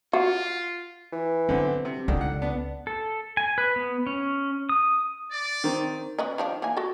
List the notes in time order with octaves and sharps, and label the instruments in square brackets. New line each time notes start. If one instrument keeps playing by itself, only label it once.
[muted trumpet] F4 [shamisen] F#4
[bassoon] E3
[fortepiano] D3 B3 C4 [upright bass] F#3
[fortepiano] C3
[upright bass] C#2 [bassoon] D3 [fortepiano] D#3
[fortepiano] F#5
[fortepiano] B3 [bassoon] D4
[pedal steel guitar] A4
G#5
B4
B3
C#4
D#6
[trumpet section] D5
[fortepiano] D#3 C4
[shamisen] C#4 B4 D#5
D#3 F3 D4
E3 A#3 G#5
F#4 A4